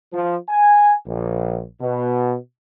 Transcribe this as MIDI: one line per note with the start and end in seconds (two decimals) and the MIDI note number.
0.13 0.36 53
0.49 0.93 80
1.06 1.63 34
1.81 2.35 47